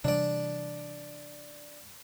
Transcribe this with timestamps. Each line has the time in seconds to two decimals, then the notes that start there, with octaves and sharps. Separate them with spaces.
0.04 C3 E3 G3 D4 D5